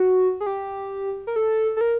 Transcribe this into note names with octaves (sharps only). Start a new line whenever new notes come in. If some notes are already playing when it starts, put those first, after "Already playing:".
Already playing: F#4
G#4
G4
A#4
A4
A4
A#4